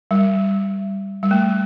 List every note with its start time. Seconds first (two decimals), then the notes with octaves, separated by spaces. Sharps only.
0.11 G3
1.23 G3
1.31 A3